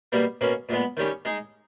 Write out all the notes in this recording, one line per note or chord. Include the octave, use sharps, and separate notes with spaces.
B2 G3 A#3
B2 A#3 C#4
A#2 G#3 B3
D#3 G3 C#4
G#3 D#4 G#4